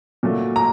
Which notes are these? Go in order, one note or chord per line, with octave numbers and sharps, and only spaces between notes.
A#2 F#3 A3
A#5